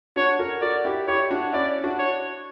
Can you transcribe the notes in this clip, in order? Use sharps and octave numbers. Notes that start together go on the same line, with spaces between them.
D4 F#4 C#5
F#4 A#4
F#4 A#4 D5
E4 G4
E4 G4 C#5
D4 F#4
C#4 E4 D5
D4 F#4
C#5